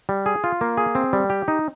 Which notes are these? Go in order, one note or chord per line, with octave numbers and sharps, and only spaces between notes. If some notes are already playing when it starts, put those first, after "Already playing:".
G3
G#4
F4
A#3
G#4
C4
G3
G4
D#4